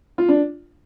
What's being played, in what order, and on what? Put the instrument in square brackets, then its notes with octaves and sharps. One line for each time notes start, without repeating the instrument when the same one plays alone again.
[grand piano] F4
D4